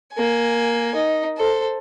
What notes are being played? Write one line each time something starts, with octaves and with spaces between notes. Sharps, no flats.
A#3 G#5
D#4
A4 C5